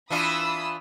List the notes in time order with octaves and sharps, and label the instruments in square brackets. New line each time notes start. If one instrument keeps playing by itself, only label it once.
[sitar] E3 D4 F4 [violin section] B5 D#6 E6